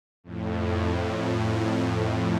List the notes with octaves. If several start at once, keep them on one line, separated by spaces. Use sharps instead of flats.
F2 A2